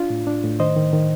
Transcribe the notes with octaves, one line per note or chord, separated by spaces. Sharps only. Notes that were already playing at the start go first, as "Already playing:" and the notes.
Already playing: D4 F4
A2
D4
A2
D#3 C5 D#5
D#3
D#3